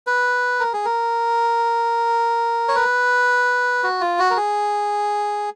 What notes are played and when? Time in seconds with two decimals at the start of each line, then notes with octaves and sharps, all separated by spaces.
0.07 B4
0.60 A#4
0.73 G#4
0.85 A#4
2.68 C#5
2.75 B4
3.83 F#4
4.01 F4
4.19 F#4
4.30 A#4
4.37 G#4